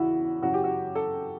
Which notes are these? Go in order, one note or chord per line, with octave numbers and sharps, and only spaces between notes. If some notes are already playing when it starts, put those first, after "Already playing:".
Already playing: E2 C#3 E3 E4 F#4
F#2 C#3 F#3 F#4
G4
F#4
A4